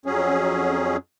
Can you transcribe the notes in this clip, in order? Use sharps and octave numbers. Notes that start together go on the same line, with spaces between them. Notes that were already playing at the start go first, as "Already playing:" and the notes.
F2 F#3 C#4 G#4